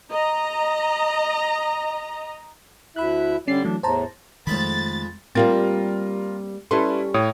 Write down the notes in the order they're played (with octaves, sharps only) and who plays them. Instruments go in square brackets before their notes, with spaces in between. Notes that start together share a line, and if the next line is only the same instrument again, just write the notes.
[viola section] D#5 A#5
[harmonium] D2 E4 E5 [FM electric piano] B5 F#6
[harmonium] D3 G3 D5 [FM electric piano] C#4 C7
[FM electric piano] E3 F#3 A3 [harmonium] D4
[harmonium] E2 A2 [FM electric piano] C5 A5 A#5
[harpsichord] F2 G#3 B5 [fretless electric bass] D#3 A3 [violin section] A6
[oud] G3 A#3 C4 [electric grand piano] F4 A#4 A6
[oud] G3 C#4 A4 [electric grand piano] E4 B4 C6
[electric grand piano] A2 C#5 D#6